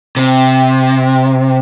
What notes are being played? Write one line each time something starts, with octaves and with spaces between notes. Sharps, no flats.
C3